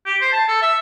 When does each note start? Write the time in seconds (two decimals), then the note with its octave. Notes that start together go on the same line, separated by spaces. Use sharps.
0.05 G4
0.21 C5
0.32 A5
0.48 A4
0.61 E5